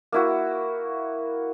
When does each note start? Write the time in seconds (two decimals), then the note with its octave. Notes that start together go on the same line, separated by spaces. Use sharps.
0.12 A#3 E4 F#4